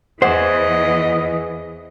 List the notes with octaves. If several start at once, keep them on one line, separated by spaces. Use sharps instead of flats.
E2 E3 G#4 C5 D#5 F#5